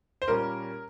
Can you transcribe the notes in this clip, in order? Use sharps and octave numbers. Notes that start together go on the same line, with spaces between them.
C5
A#2 G3 A#3 C#4 A#4